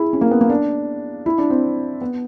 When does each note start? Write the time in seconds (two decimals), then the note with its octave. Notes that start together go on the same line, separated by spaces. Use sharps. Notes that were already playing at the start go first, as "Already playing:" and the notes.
Already playing: E4 G#4
0.13 C#4
0.21 A#3
0.31 B3
0.41 A#3
0.50 D4
1.26 E4
1.38 D4
1.50 C4
2.01 B3